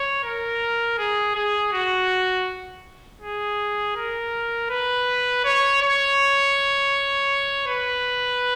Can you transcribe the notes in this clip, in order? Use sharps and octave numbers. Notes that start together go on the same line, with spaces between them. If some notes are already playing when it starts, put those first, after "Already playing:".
Already playing: C#5
A#4
G#4
G#4
F#4
G#4
A#4
B4
C#5
C#5
B4